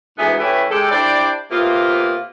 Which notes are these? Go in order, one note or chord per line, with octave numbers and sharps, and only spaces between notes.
D2 G#2 E3 B3 G#4 E5
E3 A3 C#4 E4 G4 B4
G#3 G4 A4
D4 E4 G4 C5 D5
C3 A#3 B3 F4